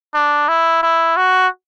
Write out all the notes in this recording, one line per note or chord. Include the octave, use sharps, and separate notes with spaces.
D4
E4
E4
F#4